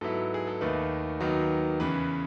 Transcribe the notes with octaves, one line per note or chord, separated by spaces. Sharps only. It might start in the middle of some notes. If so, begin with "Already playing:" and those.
G#2 F#3 B3 E4 A4
G#4
A4
D#2 D#3 A3 D#4 B4
D#2 D#3 F#3 B3 D#4
E2 C#3 E3 B4